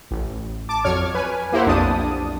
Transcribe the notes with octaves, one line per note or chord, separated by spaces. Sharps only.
A1
A5 D6
F2 F#3 C#5 F6 G#6
B4 G#5
A#3 E4 G4 C5 F#5
B1 F2 D4 A5 D#6